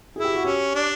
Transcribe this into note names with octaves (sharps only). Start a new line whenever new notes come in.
E4 G#4
G4
F#4
C#4 G4
D4